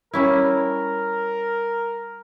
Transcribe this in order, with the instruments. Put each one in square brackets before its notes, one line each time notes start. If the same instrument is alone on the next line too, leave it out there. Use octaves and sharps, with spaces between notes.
[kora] G3 C#4 E4 [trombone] A#4